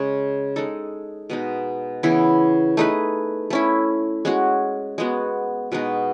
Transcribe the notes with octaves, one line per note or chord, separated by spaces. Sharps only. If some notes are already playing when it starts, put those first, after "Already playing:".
Already playing: C#3 G#3 C#4
G#3 D#4 A4
B2 G#3 D#4
C#3 E3 B3 E4
A3 D#4 G#4 B4
A3 C#4 E4
G#3 C#4 F#4
G#3 B3 F#4
B2 G#3 D#4 F#4